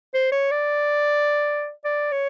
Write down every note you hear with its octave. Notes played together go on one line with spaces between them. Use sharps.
C5
C#5
D5
D5
C#5